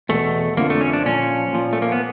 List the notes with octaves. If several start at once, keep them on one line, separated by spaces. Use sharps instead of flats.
E2 B2 A3
F2 D3 F3 A#3
A3
C#4
D4
A#2 F3 C#4
A#2 F3
A3
A#3
B3